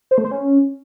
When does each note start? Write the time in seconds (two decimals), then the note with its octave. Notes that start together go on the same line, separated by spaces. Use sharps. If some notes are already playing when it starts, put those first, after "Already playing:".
0.11 C5
0.18 A3
0.25 C5
0.31 C#4